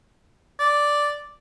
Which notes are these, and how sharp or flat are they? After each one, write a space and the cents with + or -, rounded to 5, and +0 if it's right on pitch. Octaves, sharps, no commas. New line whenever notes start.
D5 -5